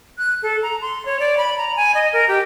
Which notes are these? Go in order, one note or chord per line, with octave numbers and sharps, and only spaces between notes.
F#6
A4
A#5
C6
C#5
D5
B5
A#5
G#5
D#5
A#4
G4